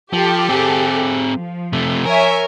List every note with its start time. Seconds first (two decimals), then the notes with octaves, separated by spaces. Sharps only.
0.13 F3 G4 A4
0.49 C4 G#4
1.37 F3
1.73 C3 A3
2.06 A#4 C#5 E5 G#5